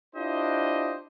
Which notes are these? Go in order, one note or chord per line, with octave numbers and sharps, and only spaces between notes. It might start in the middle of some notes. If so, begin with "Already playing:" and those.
D4 E4 F4 G4 C5 D#5